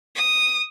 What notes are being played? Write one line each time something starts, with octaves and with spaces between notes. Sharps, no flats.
D#6